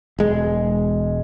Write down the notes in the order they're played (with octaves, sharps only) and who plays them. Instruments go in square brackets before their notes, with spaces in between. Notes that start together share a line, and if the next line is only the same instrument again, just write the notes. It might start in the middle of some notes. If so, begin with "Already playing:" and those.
[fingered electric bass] E1 G#3